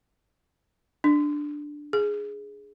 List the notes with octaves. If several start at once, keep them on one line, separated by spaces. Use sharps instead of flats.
D4
G#4